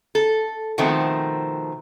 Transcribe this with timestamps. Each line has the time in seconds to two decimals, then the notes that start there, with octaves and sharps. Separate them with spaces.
0.15 A4
0.78 B2 D#3 F3 A3 C4